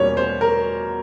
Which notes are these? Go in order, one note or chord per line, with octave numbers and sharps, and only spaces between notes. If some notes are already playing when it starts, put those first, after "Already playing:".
Already playing: E2 B2 G3 A#3 C#4 C#5
C5
A#4